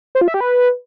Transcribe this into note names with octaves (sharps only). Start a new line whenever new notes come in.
C5
F4
E5
G4
B4